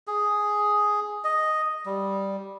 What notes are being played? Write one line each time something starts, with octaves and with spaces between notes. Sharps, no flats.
G#4
D#5
G3